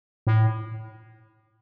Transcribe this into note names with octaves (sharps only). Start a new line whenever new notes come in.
A2